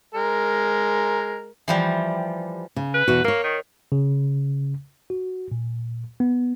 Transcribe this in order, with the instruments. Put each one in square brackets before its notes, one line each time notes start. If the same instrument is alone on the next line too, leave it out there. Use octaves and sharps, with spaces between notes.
[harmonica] G#3 A#4
[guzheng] E3 F3 G3
[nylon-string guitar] C#3
[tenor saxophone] B4
[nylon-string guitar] E2 B2 F#4
[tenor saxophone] A#3 [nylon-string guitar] A#4 C#5
[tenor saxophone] D#3
[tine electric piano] C#3
F#4
A#2
B3